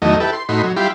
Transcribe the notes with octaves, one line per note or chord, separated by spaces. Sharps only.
E2 D#3 F#3 A3 D#5
E4 G4 A4 B4
C6
A2 D#4 F#4 B5 C6
F#3
G3 E4 F4 G4 B5 C6